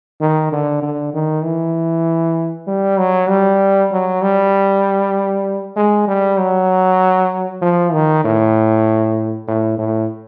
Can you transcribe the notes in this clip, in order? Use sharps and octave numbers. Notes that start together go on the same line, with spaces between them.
D#3
D3
D3
D#3
E3
G3
F#3
G3
F#3
G3
G#3
G3
F#3
F3
D#3
A2
A2
A2